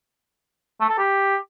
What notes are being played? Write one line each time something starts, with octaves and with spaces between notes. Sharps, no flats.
A3
A4
G4